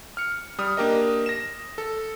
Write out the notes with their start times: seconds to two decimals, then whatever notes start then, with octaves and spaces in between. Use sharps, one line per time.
0.17 F6 C#7
0.58 G3 D#6 F6
0.77 A#3 D4 G4 A#4 D#5
1.26 A#6 E7
1.78 A4